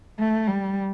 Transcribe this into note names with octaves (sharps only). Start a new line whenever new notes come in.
A3
G3